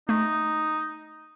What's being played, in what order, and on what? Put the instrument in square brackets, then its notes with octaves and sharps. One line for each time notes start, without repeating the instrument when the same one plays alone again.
[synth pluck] A3 [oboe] D#4